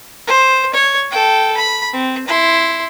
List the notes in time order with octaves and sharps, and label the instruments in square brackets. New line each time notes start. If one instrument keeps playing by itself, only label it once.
[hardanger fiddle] C5
C#5
A4 G5
B5
C4
E4 C6